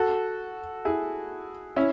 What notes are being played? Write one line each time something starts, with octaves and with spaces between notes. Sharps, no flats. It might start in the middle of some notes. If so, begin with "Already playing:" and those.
Already playing: F#4 A4
E4 G#4
C#4 E4